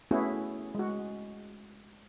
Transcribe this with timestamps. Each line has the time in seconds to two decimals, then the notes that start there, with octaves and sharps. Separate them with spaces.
0.11 A3 B3 C#4 E4 F#4 G#4
0.75 G#3 F#4